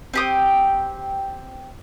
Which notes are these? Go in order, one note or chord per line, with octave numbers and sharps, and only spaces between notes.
C4 G4 D#6